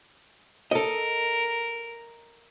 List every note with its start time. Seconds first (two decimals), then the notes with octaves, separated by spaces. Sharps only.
0.71 A4 A#4 D#5